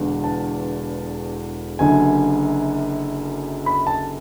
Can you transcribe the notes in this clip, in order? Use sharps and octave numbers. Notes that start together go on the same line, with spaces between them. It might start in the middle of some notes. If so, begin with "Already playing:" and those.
Already playing: E1 E2 D3
A5
F#1 F#2 D3 G#5
B5
A5